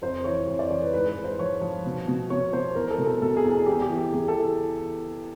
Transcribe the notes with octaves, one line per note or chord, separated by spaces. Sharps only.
F2 C5
E3 C#5
F2 C#5
D5
E3 C#5
B4
G#2 B4
B4
G#2
C5
F3 C#5
F3
B2
B2
B2 C#5
B2 C5
E2 A#4
A4
B2
A4
B2 A4
G#4
E2
G#4
E2 G4
G4
E3
G4
E2 G#4
A4
E3